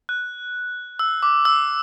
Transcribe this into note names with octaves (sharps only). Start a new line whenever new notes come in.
F#6
E6
D6
E6